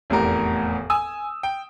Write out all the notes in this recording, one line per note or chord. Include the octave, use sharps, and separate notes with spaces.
F1 E2 A2 G4 A#4 A#5
G#5 D#6 E6
G5